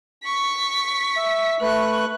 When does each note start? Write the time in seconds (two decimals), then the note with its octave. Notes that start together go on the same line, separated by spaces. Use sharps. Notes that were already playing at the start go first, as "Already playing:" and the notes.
0.24 C#6 B6
1.16 E5
1.61 A3 B4 C#6 F#6